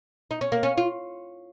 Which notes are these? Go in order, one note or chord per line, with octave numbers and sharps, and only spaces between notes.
D#4
C#4
A#3
C#4
F4